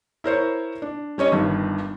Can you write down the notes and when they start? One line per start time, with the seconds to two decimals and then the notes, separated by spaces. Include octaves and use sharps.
0.24 E4 A#4 C5 C#5
0.82 D4
1.18 G3 C#4 C#5 D#5
1.32 G1 G2 D#3